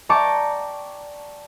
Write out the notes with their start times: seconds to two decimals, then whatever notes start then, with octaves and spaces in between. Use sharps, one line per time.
0.09 D5 G5 A5 A#5 C#6 D6